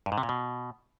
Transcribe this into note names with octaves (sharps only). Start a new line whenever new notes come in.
G2
G#2
C3
A#2
B2